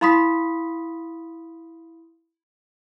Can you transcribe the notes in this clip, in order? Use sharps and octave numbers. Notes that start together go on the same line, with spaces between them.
E4 F5 B5 C6 D#6 B6